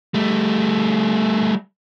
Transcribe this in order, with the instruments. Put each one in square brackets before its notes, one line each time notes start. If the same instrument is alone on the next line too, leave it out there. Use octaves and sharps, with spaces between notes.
[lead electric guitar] G3 A3